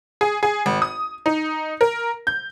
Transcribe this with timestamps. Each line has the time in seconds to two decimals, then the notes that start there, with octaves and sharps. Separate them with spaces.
0.21 G#4
0.43 G#4
0.66 G#1
0.82 D#6
1.26 D#4
1.81 A#4
2.27 G6